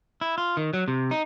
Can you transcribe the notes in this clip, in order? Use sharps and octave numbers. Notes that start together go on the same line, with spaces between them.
E4
F4
D#3
F#3
C3
D#4